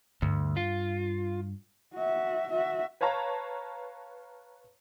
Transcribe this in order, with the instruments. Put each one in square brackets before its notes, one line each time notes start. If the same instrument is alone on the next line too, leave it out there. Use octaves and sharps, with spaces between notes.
[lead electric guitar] D2 [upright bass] G2
[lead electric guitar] F4
[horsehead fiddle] F#4 E5
F#4 E5
[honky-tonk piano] B4 C#5 F5 A5 A#5